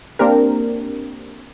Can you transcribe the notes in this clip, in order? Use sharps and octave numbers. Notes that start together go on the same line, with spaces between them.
A#3 C4 D4 G4 A#4